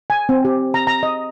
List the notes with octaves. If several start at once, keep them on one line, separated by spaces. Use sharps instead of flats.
G#5
C4
G4
A#5
A#5
D#5